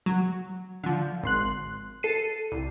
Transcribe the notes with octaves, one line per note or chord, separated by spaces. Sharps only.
F#3
D3 F3
G#1 C6 F#6
A4 C7 D#7
C2